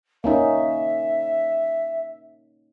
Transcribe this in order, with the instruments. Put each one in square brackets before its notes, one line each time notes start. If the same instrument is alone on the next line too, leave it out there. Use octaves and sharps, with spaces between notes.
[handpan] A#3 C#4 D#4 [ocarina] E5